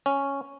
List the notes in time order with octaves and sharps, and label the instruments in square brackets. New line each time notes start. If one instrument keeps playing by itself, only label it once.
[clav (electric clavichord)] C#4